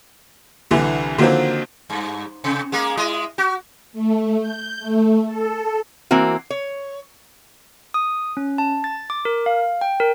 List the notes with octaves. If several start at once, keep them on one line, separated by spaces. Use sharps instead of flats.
C2 D3 E3
D3 D#3 F3 F#3 A#3 C4
G2
C3
G#3 A#3 G#4
G#3 E4 D#5
F#4
A3
G6
A3
A4
E3 A#3 C4 F#4
C#5
D#6
C#4
A5
A6
D6
A#4
F5
G5
A#4